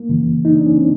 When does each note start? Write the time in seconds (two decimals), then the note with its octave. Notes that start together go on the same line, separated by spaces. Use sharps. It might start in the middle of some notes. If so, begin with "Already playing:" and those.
Already playing: A#3
0.09 F#2 C#3 E3
0.45 D#4
0.55 D4
0.66 C#4
0.77 C4